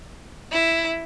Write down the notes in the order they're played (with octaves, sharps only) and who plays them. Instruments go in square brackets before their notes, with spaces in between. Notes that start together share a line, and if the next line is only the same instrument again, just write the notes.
[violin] E4